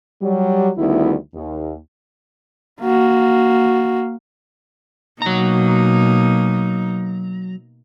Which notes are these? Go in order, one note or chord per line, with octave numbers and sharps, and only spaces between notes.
F#3 G3
D2 D#3 G3 B3 E4
D#2
A#3 F#4
B2 F#3 A#3 D#4 A#5